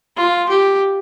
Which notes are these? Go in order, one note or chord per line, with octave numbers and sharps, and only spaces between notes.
F4
G4